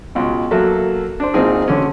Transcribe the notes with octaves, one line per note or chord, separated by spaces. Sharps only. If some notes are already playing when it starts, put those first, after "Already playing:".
C#2 B2
F#3 A#3 F#4 A4 E5
D4 C5
G#1 A#2 C4 D#4 G#4
B1 D3 C#4